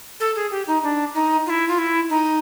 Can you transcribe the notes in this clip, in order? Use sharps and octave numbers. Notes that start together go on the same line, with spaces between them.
A4
G#4
G4
D#4
D4
D#4
F4
E4
F4
E4
D#4